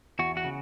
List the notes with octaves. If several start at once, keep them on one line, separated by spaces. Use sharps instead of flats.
E2 F#4
F#4
C#3